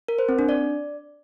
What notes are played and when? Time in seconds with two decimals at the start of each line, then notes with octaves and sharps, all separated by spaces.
0.08 A#4
0.19 C5
0.29 C4
0.39 D4
0.49 D5